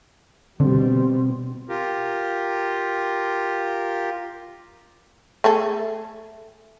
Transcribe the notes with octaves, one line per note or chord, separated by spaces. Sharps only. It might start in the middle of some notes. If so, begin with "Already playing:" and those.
B2 D3 G3 C4
F4 G4 A#4
A3 G#4 A4